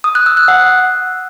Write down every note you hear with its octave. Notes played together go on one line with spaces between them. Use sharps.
D#6
F#6
E6
F#6
F#5